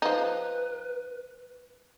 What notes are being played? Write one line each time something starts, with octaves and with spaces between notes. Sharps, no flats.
F3 D#4 B4